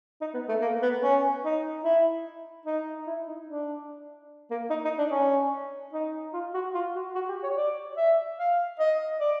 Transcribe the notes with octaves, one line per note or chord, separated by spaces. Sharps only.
D#4
B3
A3
A#3
B3
C#4
D#4
E4
D#4
E4
D#4
D4
A#3
D#4
D#4
D4
C#4
D#4
F4
F#4
F4
F#4
F#4
G4
C#5
D5
E5
F5
D#5
D5